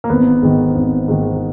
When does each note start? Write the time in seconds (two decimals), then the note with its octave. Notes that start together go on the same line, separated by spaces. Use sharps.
0.04 A#3
0.09 G#1 B3
0.42 G#2 D#3
0.75 G#1
1.08 G#2 D#3